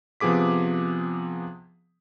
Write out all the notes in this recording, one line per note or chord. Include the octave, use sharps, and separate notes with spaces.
C3 F3 B3 G#4 D6 B6